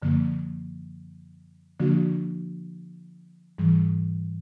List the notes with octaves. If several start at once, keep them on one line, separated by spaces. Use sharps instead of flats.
F#2 D3 F3 A#3
D3 F3 A#3 D4 F#4
G#2 E3 G3